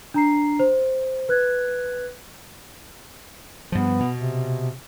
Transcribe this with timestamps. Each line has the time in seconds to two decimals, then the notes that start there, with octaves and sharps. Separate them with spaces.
0.14 D4 A#5 C7
0.59 C5
1.29 B4 F#6 G#6
3.72 G2 F3 B3
4.00 B2
4.14 C3